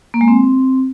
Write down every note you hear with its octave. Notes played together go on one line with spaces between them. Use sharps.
A#3
G#3
C4